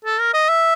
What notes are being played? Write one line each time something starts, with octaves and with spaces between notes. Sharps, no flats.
A4
A#4
D#5
E5